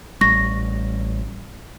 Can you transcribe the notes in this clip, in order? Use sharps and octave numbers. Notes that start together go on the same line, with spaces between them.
A1 G3 C#6 A#6